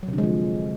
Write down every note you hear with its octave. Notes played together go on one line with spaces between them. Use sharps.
F#3
C3
D3
G#3
F3